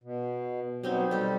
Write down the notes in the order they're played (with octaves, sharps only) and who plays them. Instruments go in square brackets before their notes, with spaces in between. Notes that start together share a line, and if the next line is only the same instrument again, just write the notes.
[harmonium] B2
[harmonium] B2 F#3 [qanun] G3 C4 D#4
[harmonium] G3 [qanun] G4 A4